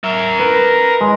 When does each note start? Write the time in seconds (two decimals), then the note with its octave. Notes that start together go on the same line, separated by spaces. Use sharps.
0.04 A#4 E5
0.39 B4
1.01 G#3